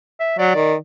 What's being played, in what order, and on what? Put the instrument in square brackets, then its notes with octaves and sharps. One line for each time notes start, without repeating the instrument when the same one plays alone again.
[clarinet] E5
[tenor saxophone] F#3 [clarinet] D5
[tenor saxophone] D#3